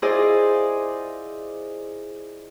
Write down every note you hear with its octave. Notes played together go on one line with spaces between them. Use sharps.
E4 F4 G#4 C5 D5 D#5